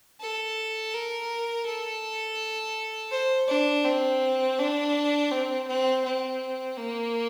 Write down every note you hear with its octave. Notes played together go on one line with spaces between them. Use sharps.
A4
A#4
A4
C5
D4
C4
D4
C4
C4
C4
A#3